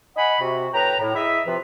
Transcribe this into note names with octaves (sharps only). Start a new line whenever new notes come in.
D#5 F#5 G#5 B5
C3 F#4
A2 B4 G5 A#5
A2
E4 G#4 D#5 E5
C3 F3 F4 B4